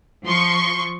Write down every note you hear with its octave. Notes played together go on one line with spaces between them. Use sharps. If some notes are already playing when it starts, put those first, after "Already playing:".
F3 C6 C#6